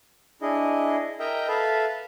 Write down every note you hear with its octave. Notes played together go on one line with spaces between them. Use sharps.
D4 E4 G#4 D#5
A#4 D#5 E5 G5 A#5
A4 B4 E5 F5 A5 B5